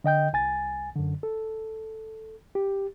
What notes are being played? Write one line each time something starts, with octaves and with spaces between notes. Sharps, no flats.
D3 D#5 G5 G6
C2 G#5 A6
F#2 D3
A4
G4